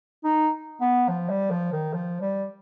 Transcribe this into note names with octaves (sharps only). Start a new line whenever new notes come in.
D#4
B3
F3
G3
F3
D#3
F3
G3